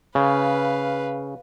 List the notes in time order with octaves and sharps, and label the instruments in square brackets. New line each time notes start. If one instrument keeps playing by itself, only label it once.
[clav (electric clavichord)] C#3 [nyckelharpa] B4 F5